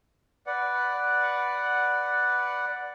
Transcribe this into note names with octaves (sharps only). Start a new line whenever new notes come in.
B4 D5 F#5